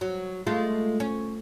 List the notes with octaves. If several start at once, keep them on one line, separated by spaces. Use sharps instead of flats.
F#3
G#3 A3 F4
C#4